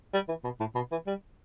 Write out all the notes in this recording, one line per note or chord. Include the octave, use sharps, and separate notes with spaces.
G3
E3
B2
A2
B2
E3
G3